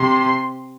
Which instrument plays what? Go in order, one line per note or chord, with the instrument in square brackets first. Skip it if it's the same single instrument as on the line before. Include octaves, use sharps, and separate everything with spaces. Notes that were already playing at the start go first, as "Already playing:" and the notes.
Already playing: [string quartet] C3 [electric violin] C6